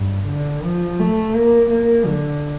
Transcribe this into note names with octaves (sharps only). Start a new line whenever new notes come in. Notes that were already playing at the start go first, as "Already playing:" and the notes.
Already playing: G2
D3
F3
A3
A#3
A#3
D3